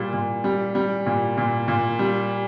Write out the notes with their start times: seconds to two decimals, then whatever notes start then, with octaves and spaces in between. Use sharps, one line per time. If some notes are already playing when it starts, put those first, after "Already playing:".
Already playing: A#2 G3
0.13 A#2
0.44 G3
0.75 G3
1.06 A#2
1.37 A#2
1.68 A#2
1.99 G3